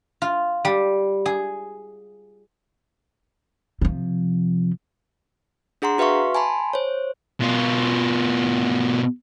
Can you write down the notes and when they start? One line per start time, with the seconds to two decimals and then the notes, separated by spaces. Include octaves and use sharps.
0.22 F4
0.65 G3
1.26 G#4
3.81 C3 F3
5.82 D4 G#4 F#5 A#5 C6
5.98 F#4 B4 E5 F5 C6 C#6
6.35 G#5 A5 B5 C6
6.73 C5 C#5
7.40 B2 F4